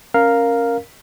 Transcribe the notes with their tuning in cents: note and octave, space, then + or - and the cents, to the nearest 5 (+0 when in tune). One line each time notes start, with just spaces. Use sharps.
C#4 -5 A#4 +0 F5 +5